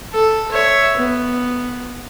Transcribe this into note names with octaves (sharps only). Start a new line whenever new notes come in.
A4
C#5 E5
B3